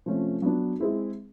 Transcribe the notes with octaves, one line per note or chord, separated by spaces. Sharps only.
C3 F3 A3 C#4
F#3 B3 D4
G#3 C4 E4 G#4